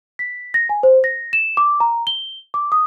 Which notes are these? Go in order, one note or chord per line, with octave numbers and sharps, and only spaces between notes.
B6
A#6
G#5
C5
A#6
E7
D6
A#5
G7
D6
D#6